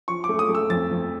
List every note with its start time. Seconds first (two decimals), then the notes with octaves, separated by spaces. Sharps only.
0.08 F3 C#6
0.24 D6
0.29 A3
0.39 D#6
0.49 A3
0.55 E6
0.70 F2 A6
0.91 F2